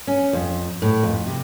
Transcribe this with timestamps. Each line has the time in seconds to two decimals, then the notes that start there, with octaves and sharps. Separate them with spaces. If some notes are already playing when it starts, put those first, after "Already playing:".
0.07 C#4
0.33 F2
0.82 A2
1.03 F2
1.27 C3